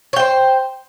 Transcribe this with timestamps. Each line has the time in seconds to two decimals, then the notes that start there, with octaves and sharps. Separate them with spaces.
0.13 C#5
0.16 G5
0.19 C5